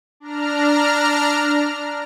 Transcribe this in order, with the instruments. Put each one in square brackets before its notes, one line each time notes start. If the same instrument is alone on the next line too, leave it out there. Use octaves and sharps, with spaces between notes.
[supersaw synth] D4 A#5 F6